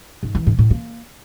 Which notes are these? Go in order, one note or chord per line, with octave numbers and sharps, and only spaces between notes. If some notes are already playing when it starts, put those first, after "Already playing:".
G#2
E3
G#2
A2
A#3